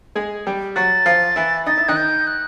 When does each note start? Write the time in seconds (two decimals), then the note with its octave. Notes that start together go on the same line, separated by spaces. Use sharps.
0.15 G#3 G#4
0.47 G3 G4
0.76 F#3 F#4 A6
1.06 F3 F4
1.36 E3 E4
1.66 D#4 A6
1.77 E4
1.88 D#3 D#4 F#6
1.96 G6
2.27 F#6